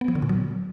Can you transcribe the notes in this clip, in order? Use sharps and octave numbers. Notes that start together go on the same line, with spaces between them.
B3
F3
D3
A#2
F#3